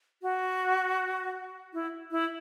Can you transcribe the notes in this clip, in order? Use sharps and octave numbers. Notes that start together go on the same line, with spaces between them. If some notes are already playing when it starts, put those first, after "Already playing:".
F#4
E4
E4